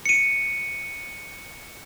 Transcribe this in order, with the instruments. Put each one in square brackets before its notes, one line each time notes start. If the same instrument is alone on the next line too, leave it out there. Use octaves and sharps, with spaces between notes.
[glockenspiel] C#7 D#7